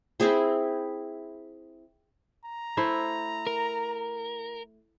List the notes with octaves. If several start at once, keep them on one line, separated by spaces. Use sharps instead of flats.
C4 E4 G#4 C5
A#5
A3 E4 C5
A#4